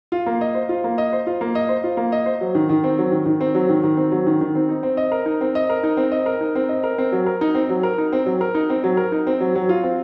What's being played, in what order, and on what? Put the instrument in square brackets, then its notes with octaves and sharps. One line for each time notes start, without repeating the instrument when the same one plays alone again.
[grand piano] F4
A#3
D#5
C5
F4
A#3
D#5
C5
F4
A#3
D#5
C5
F4
A#3
D#5
C5
F#3
D#3
D#3
C4
F#3
D#3
D#3
C4
F#3
D#3
D#3
C4
F#3
D#3
D#3
C4
D#4
C4
D#5
A#4
D#4
C4
D#5
A#4
D#4
C4
D#5
A#4
D#4
C4
D#5
A#4
C4
F#3
A#4
D#4
C4
F#3
A#4
D#4
C4
F#3
A#4
D#4
C4
F#3
A#4
D#4
C4
F#3
F#3
F4
C4